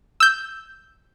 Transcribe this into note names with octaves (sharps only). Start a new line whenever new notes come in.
E6 G6